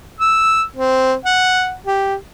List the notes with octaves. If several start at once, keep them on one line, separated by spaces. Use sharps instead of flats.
E6
C4
F#5
G4